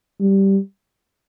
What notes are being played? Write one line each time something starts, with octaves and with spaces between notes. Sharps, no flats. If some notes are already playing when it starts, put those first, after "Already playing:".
G3